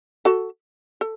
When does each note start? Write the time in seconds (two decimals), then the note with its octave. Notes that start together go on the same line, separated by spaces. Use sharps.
0.25 F#4 A4
1.01 A4